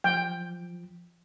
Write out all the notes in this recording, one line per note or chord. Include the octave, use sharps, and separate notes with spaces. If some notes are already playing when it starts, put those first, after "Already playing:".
F3 G5